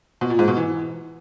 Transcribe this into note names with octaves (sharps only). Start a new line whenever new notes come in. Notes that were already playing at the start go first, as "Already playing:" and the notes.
B2
A#2
G#2
B2
E3